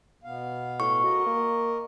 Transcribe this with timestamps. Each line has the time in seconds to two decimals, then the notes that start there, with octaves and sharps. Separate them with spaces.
0.24 B2 B3 F5
0.80 A2 C#6
1.03 F#4 A#4 D#5
1.26 A#3